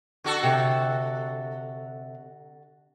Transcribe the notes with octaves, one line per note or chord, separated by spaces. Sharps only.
D3 F#4 A4
C3